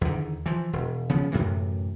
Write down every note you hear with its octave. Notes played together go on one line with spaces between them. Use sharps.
E2 D3 D#3
E3 F3
E1
C#3 F3 B3
F#2 A2 C3 E3